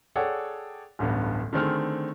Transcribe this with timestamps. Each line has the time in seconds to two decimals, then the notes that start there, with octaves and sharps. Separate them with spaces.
0.16 G#4 A4 C#5 D5 F#5 G5
0.99 D1 A1 G2 B3
1.53 D3 D#3 A3 C4 G#4 F6